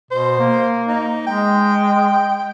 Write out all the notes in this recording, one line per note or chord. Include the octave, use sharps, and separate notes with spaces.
B2 C5
A#3
D#4
G#3 G5